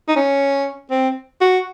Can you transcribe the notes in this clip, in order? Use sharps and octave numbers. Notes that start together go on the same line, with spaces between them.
D#4
C#4
C4
F#4